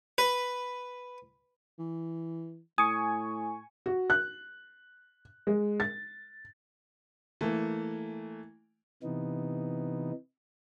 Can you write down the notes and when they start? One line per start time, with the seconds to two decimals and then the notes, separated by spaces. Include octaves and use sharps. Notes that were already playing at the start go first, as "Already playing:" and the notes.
0.18 B4
1.79 E3
2.78 A2 G#5 C#6 D#6
3.86 F#4
4.10 F#6
5.47 G#3
5.80 A6
7.41 E3 A3 A#3
9.03 C3 E3 B3 D#4